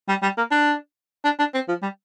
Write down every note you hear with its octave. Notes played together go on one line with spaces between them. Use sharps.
G3
G3
A#3
D4
D4
D4
C4
F3
G3